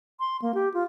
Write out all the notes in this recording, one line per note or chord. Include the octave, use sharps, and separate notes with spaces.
C6
A#3
G4
F4